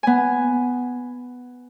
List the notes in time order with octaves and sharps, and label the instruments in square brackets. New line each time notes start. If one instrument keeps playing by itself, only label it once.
[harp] B3 G#5